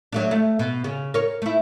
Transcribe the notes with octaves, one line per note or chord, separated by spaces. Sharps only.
F#3 A3 D4
A3
B2
C#3
A#4 C#5
A3 E4